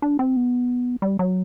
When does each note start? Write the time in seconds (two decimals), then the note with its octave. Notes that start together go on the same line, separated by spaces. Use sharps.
0.02 D4
0.19 C4
0.36 B3
1.02 G3
1.19 F#3